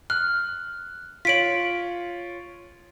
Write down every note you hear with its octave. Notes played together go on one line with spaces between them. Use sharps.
F6 F#6
F4 C#5 B6 D7 F#7